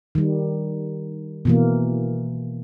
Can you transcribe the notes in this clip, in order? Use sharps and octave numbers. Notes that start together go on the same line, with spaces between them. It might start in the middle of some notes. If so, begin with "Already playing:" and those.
D#3 G3
B2 E3 A#3